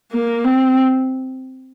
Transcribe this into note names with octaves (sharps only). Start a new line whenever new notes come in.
A#3
C4